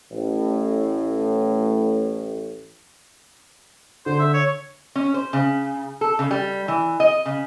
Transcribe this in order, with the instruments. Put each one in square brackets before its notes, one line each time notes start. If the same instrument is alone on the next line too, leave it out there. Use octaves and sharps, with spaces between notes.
[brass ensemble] A1 A2
[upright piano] D3 [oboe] C5
[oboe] E5
C#5
[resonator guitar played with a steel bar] C#4
C5
C#3
A4
C#3
G3
E3
D#5
C#3